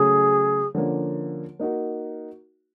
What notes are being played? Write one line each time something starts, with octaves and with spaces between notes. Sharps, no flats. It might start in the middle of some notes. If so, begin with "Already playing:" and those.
Already playing: C#3 F#3 A3 G#4
D3 F3 A#3 C#4
A#3 D#4 F#4 A#4